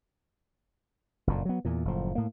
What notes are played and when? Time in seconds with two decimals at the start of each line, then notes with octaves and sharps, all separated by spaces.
1.27 F#1 F2 A#2
1.45 F#3 B3
1.65 E2 A#2
1.85 F#1 A2 F3
2.15 A2 A#3